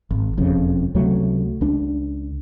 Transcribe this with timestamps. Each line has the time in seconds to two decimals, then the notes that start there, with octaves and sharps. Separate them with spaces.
0.11 G#1
0.37 E1 F2 C#3
0.95 C#2 C3 F#3 A3
1.61 C#2 D4